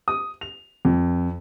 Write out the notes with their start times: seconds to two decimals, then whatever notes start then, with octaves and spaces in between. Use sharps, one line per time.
0.08 D#6
0.41 F7
0.85 F2